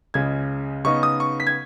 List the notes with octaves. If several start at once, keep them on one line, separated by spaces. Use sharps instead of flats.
C#2 C#3 G#3 G#6
C#3 B3 D#4 C#6
D#6
C#6
B6
G#6